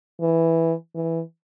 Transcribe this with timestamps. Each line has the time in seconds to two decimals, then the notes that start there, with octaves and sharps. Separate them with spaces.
0.20 E3
0.95 E3